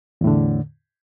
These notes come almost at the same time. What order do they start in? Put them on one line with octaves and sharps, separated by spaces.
E2 A2 D3